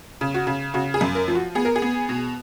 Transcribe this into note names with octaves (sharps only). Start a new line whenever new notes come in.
C#3
F#4
C#3
C#3 F#4
G#4
F#2
A#4
F3
F#4
B3 G#4
A#4
G#4
B3
B2